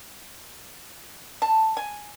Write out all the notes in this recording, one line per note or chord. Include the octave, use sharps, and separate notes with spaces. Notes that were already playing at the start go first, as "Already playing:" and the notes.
A5
G#5